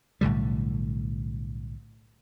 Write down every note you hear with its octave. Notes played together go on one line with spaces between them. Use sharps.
B1 A2 D3 G3